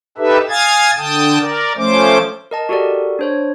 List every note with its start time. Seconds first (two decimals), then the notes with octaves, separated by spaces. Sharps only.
0.18 D#4 G4 A4 B4 E5
0.49 F5 G#5 D#6 G#6 A6
0.97 D3 G5 A5 D#6
1.40 A#4 D5
1.77 F3 A3 C#4 C5 D6
2.51 A#4 D#5 A5
2.69 F#4 G4 A4 A#4 D5
3.19 D4 C5 C#5